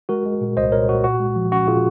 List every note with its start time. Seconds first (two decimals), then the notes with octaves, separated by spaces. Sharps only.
0.09 G#3 F#4 A#4
0.26 G#3
0.41 A#2
0.57 C2 C5 D#5
0.72 A#2 A#4 C#5
0.88 A#2 F#4
1.04 A#2 F#4
1.20 G#3
1.36 F3
1.52 C#4 F#4
1.67 A#2 F4 G#4